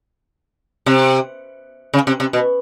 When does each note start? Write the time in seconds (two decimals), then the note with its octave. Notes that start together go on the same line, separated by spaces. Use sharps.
0.86 C3
1.94 C#3
2.07 C3
2.20 C3
2.33 B2